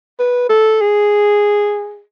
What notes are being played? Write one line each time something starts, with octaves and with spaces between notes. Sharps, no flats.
B4
A4
G#4